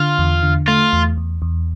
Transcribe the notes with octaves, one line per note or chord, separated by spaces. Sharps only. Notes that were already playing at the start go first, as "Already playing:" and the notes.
Already playing: D3 F4
E2
D3
A3 F4
E2
E2
E2